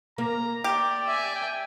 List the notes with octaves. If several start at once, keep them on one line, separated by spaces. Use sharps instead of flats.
A#3 A#5
G4 D5
E5 G#5
G5